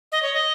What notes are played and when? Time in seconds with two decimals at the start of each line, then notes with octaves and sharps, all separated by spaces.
0.12 D#5
0.22 C#5
0.34 D#5